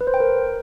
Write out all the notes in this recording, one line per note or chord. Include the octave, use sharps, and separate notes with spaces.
B4
C5
G5
A#4